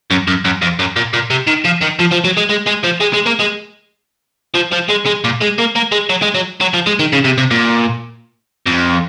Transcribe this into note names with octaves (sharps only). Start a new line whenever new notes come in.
F#2
F#2
F#2
F2
F#2
A#2
A#2
C3
D#3
F3
D#3
F3
F3
F#3
G#3
G#3
G#3
F3
G#3
G#3
A#3
G#3
F3
F3
G#3
G#3
A#2
G#3
A#3
A#3
G#3
F#3
G#3
F#3
F#3
F3
G#3
D#3
C#3
C3
C3
A#2
F2